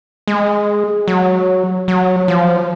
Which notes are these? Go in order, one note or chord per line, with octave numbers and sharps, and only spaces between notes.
G#3
F#3
F#3
F3